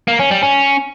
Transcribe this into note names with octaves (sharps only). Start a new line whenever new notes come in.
A#3
C#4
G3
C#4